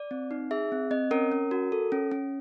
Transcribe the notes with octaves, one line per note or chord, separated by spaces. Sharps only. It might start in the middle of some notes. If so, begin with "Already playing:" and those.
Already playing: D5
C4
D#4
G#4 E5
C4
C4 D#5
C#4 A#4
C#4
F#4
A4
C#4
C#4